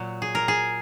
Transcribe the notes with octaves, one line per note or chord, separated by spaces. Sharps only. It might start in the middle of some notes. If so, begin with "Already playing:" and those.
Already playing: A#2 F#3
G#4
A#4
G#4